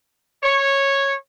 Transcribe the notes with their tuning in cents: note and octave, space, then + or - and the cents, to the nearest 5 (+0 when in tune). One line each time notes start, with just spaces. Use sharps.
C#5 -10